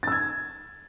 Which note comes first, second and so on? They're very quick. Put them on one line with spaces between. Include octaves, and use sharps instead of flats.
A6 E6 G#6